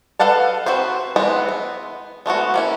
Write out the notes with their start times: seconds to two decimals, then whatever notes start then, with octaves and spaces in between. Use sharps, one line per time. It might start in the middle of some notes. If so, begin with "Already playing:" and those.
0.20 A4 B4 F5 F#5 A5
0.66 C4 F#4 B4 C5
1.16 E3 G#3 B3 C4
1.49 B3
2.26 G#3 A3 B3 F#4
2.54 A#3 C#4 E4